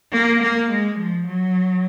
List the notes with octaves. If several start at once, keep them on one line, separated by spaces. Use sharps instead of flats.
A#3
A#3
G#3
F3
F#3